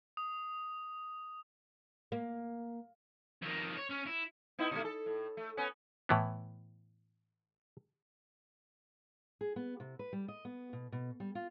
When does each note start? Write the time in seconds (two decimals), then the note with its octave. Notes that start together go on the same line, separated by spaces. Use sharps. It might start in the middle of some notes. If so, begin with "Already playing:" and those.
0.17 D#6
2.12 A#3
3.42 F2 D#3
3.76 C#5
3.90 C#4
4.06 E4
4.59 B3 D#4 E4
4.71 B2 D#3 A3
4.85 A4
5.06 A2
5.37 A3
5.57 B3 C#4
6.09 A2 E3 B3
9.41 G#4
9.56 B3
9.80 C3
9.99 B4
10.13 G3
10.28 D#5
10.45 B3
10.73 B2
10.92 B2
11.20 G3
11.35 F4